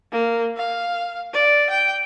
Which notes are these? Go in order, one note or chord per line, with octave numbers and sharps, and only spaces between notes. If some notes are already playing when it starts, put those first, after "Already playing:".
A#3
F5
D5
G5